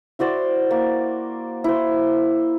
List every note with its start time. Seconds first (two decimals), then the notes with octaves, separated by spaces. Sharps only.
0.19 E4 F#4 C5 D5
0.71 A#3
1.64 E4 C5